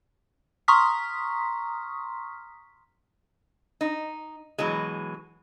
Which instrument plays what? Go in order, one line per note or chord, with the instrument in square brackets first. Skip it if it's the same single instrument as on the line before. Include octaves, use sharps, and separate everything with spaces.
[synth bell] A#5 C6 C#6 D#6 F6 B6
[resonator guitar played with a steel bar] D#4
B2 E3 F#3 G#3